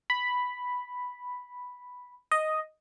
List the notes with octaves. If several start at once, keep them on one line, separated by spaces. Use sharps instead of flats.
B5
D#5